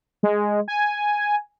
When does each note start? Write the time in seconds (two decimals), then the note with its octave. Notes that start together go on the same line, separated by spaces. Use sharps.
0.23 G#3
0.68 G#5